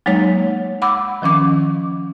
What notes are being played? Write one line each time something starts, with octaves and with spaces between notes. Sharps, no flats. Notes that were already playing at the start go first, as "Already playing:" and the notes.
F#3 G#3 A#3 D#4 C#5
F#5 B5 D6 E6
D#3 F3 C#4 D6